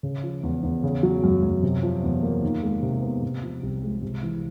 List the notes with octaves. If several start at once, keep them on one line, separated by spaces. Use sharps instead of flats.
C#3
F3
E2
E2
C#3
F#3
F#2
F#2
C3
F3
E2
A#3
D#3
G#3
C3
B3
C3
F3
C2
G#3
C3
E3